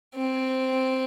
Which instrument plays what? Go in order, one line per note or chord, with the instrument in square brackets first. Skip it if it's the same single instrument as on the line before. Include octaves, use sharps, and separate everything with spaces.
[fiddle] C4